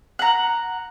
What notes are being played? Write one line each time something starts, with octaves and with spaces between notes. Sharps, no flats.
F#5 A#5